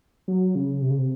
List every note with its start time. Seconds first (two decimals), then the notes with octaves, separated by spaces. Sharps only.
0.28 F#3
0.55 C#3
0.82 C3
0.90 C#3
0.98 C3